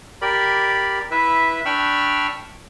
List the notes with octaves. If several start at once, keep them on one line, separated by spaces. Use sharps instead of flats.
G4 A#4 D5 B5
E4 B4 E5
D4 G5 B5 C#6 E6 F6